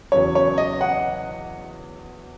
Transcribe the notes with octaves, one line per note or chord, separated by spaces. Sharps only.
E2 C#3 F#3 C#4 C#5
C#5
D#5
F#5